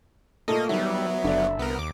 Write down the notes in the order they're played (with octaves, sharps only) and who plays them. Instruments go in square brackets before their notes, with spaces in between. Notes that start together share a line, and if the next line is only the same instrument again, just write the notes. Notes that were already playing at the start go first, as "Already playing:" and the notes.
[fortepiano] A#2 A3 A4 [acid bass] A#3 [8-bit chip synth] D#5
[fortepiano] D#3 [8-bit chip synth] F#3 B3 [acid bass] G3 [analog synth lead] E5
[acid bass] F#1 [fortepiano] D3 D5
[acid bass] C2 [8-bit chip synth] B3 A#4
[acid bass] D#2 [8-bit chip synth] D6